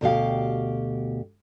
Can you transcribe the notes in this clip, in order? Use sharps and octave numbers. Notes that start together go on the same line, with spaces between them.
D2 B2 G4 F5